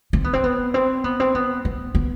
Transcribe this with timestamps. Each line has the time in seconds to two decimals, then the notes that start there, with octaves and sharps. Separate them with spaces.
0.13 C4
0.24 B3
0.33 C4
0.44 B3
0.74 C4
1.04 B3
1.20 C4
1.35 B3
1.65 B3
1.95 B3